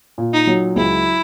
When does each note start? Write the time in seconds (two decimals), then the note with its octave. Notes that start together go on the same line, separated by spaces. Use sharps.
0.18 A#2
0.33 D#4
0.47 F#3
0.76 C#2 E4